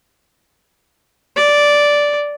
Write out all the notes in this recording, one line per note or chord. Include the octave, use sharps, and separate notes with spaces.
D5